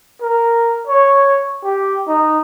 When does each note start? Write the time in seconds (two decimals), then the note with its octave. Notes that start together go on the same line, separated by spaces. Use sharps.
0.21 A#4
0.87 C#5
1.64 G4
2.07 D#4